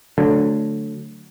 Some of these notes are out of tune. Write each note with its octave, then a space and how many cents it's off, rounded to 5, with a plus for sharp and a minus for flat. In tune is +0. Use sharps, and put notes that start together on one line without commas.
D3 +0 F#3 -15 A3 +0